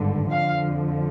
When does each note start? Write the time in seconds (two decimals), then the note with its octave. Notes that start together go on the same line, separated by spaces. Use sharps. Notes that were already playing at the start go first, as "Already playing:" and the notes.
Already playing: G#1 G2 D3
0.30 F2 D3 F3 F5